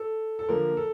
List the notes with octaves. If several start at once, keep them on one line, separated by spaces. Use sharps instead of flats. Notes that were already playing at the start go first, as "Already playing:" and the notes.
Already playing: A4
A4
D3 F3 A#3 A#4
A4